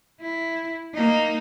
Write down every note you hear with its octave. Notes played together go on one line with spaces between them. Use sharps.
E4
A#3 D#4